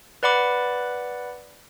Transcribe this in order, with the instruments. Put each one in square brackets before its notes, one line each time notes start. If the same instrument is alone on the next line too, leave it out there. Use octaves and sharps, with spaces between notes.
[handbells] B4 D5 F#5 B5 D6